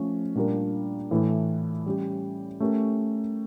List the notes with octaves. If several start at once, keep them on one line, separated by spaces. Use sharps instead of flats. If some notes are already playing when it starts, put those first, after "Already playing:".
Already playing: F3 A3 C#4
A#2 G3 D4 F4 A#4
A2 E3 A3 E4 A4
G3 C#4 G4
A3 C#4 G4 A#4